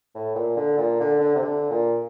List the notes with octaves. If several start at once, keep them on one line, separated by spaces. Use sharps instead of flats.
A2
A#2
D3
A#2
D3
D3
C3
D3
A#2